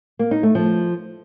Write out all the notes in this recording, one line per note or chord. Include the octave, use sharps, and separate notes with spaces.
A#3
D#4
A3
F3